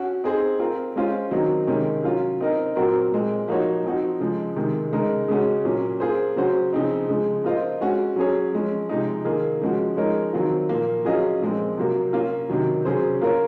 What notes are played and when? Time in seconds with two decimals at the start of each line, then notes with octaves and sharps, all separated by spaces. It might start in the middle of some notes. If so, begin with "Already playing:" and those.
Already playing: C#4 F#4
0.24 C4 D#4 G#4 C5
0.59 C4 F4 A#4
0.96 G#3 C#4 F4 C5
1.31 D#3 F#3 C4 D#4
1.67 C3 D#3 G#3 C#4
2.04 F#3 C#4 F4
2.40 C4 D#4 A#4 D#5
2.76 A#2 F#3 C4 F#4 A#4
3.11 A#2 G#3 C4
3.48 F3 A#3 D#4 F#4 C#5
3.84 F3 C4 D#4 F#4
4.20 C#3 F3 G#3
4.56 C3 D#3 G#3
4.93 C#3 G#3 D#4 A#4
5.28 C#3 G#3 C#4 F#4
5.65 A#2 F#3 C#4
6.00 A#3 F4 G#4 C5
6.36 C#3 F#3 C#4 F#4 C5
6.73 C#3 F3 C4 D#4
7.08 C#3 F3 G#3
7.44 A#3 F4 C5 D#5
7.81 G#3 C#4 F#4
8.16 F#3 C#4 G#4 C#5
8.52 F3 G#3 C#4
8.89 C3 F3 G#3 D#4
9.25 D#3 A#3 F4 G#4
9.61 C#3 F3 G#3 C#4 F#4
9.97 F3 G#3 D#4 A#4 C#5
10.33 D#3 F#3 C4 F4
10.69 A#2 F3 A#3
11.05 F#3 C#4 F4 G#4 D#5
11.41 A#2 F3 G#3 C4
11.77 C3 F#3 A#3
12.13 A#3 C#4 F4
12.49 C3 D#3 F#3
12.85 C#3 F#3 C#4 G#4 C5
13.21 A#3 F4 A#4 C#5